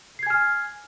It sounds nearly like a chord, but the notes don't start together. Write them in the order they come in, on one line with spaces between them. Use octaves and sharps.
C7 G#6 G#5 F6